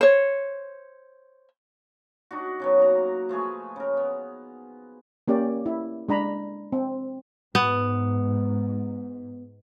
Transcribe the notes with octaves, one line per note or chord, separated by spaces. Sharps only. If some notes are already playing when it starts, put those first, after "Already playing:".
C5 C#5
D4 D#4 F#4
C#3 F#3 B3
A#3 A#5
F3 A3 G#4 B4
C#3 A#4
B3
A#3 C#4 G4 D5
E4
G#3 D4 A#5 B5
C4
G#2 B3